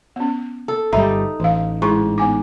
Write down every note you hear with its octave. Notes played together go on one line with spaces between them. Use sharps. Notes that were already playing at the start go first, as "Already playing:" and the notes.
B3 C#4
A4
G1 G3 D#4 E5 B5
A1 E3 F5
G#2 E4
B3 G#5 D6